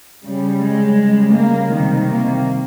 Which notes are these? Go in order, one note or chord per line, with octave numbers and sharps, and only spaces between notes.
C#3 G3
G#3
C#3 G3
A#3
C3 D#3 G3
A#3